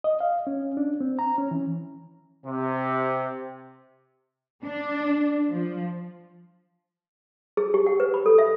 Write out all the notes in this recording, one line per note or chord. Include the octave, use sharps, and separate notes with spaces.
D#5
F5
C#4
D4
C4
A#5
C#4
E3
C3
D4
F3
G#4
G4
F#5
B4
B5
A4
E5